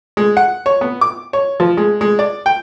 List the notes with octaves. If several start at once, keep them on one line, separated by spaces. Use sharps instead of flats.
G#3
F#5
C#5
B3
D6
C#5
F3
G#3
G#3
D5
G5